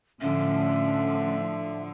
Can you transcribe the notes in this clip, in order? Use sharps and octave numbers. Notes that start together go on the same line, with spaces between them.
A2 D3 F3 C#4 E5